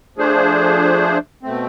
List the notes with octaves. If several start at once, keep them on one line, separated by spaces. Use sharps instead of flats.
F3 A3 D4 G#4 C5
B2 A3 C4